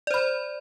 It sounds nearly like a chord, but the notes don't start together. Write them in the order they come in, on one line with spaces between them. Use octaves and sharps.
D5 C5 B5